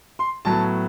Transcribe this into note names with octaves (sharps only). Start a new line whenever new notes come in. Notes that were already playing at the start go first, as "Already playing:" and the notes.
C6
A2 F#3 B3 A5